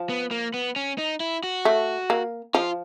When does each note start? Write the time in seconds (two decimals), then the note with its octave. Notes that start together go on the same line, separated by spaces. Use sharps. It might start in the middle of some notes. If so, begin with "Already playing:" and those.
Already playing: F3
0.10 B3
0.31 A#3
0.54 B3
0.76 C#4
0.98 D#4
1.20 E4
1.43 F#4
1.65 A3
2.10 A#3
2.54 F3 F4